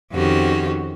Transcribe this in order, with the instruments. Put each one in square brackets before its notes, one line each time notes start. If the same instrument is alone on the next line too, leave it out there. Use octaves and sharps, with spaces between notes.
[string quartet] F2 D#3 C#4 F#4 G4